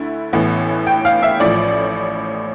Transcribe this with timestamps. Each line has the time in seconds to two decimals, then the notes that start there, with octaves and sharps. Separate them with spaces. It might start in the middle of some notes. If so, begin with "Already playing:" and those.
Already playing: D2 D3 A3 E4
0.33 A1 A2 E3 B3
0.87 G5
1.05 F5
1.22 E5
1.40 A1 A2 F3 D5